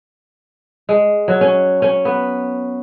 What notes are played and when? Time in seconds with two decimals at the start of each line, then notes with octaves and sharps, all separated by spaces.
0.89 G#3
1.28 F#3
1.41 C#4
1.82 C#4
2.05 B3